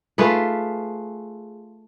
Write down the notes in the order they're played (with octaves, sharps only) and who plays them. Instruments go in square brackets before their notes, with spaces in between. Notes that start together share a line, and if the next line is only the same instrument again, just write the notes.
[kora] A3 F4 G#4 B4